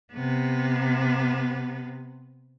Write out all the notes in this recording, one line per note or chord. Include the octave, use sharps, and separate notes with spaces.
C3 B3